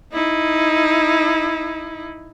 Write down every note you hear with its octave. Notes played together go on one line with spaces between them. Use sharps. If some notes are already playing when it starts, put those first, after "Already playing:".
D#4 E4